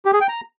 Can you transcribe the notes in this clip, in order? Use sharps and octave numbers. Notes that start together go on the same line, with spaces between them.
G4
G#4
G5
A#5